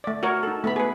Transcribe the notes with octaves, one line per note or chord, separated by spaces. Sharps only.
A3 D5
F#4 A#4 C#5
D#4 A4
A3 B3 B5
G#4 B4